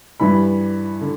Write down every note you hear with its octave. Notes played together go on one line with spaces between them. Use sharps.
G2 E3 G3 B5
D3